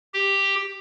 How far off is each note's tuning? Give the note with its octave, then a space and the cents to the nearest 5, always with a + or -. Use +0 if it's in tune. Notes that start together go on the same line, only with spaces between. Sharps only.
G4 +5